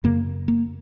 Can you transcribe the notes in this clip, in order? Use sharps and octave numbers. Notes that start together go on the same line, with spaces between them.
F#2 C#3 A#3
A#3